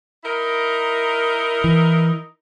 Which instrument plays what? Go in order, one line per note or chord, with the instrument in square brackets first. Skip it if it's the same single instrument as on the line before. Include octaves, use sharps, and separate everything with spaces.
[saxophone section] D#4 E4 A#4
[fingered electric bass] E3